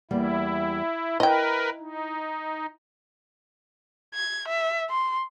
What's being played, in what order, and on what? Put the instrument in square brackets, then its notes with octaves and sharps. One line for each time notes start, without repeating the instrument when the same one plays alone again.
[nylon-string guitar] E2 G3 A#3 [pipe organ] E4
[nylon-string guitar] E4 [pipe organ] A#4 B4 [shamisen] D#5 G5
[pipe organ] D#4
[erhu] G#6
E5
C6